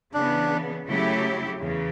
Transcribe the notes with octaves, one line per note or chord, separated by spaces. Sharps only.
C#3 E3 B3 D4
C#3 F#3 A3 E4 G4
E2 C#3